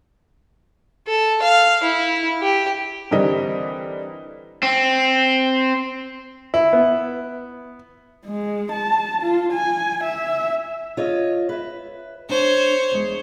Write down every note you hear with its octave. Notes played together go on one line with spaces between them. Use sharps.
A4
F5
E4
G4
D3 E3 G3 C4 A#4 D#5
C4
E4
B3
G#3
A5
F4
G#5
E5
F4 C#5 D#5
B4 E5
D4 C5 C#5
E2 G#3